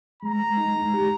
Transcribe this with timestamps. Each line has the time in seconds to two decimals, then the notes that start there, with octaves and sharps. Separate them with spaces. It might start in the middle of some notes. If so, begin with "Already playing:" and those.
0.23 G#3 A#5
0.40 G#3
0.57 D#4
0.75 G#3
0.93 G4